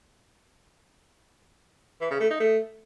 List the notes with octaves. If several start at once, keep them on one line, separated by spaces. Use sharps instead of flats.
E3
C#3
A3
D#4
A3